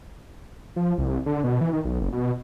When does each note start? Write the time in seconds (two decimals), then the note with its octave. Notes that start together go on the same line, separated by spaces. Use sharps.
0.76 F3
0.98 C2
1.26 D3
1.44 B2
1.61 E3
1.73 D#3
1.84 B1
2.01 F#1
2.13 B2